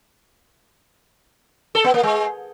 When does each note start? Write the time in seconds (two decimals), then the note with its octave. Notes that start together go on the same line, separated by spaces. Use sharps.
1.75 A4
1.84 B3
1.94 A#3
2.03 G#3